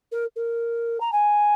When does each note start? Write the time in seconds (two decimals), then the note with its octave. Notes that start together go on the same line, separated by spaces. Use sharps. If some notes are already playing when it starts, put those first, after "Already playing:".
0.12 A#4
0.36 A#4
1.00 A#5
1.12 G#5